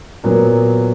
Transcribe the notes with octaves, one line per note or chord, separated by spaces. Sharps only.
A#2 F#3 B3 A#4